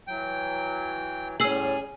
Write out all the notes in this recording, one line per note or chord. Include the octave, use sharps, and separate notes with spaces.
E3 F#3 G5
A2 G3 C#4 G#4 E6 F6 C7 F#7